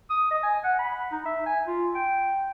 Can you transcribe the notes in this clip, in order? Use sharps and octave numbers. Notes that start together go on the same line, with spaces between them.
D#6
D#5
G#5
F#5
B5
D#4
E5
G#5
F4
G5